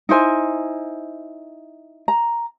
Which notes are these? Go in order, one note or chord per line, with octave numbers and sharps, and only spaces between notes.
D#4 E4 C5 G#5
A#5